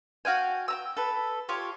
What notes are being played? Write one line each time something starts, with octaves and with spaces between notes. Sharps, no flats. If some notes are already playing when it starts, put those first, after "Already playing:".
F#4 F5 G5 G#5
G5 A#5 E6
A4 B4
F4 G4 C#5